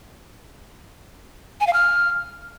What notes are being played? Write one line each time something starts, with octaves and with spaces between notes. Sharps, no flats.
G#5
F5
F6